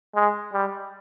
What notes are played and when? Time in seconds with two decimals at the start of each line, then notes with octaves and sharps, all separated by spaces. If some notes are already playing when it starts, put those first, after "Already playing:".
0.15 G#3
0.53 G3